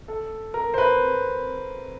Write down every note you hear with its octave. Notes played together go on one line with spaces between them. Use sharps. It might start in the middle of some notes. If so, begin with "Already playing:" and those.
A4
A#4
C5
B4